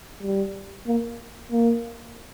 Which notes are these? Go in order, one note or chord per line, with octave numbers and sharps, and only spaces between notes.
G3
A#3
A#3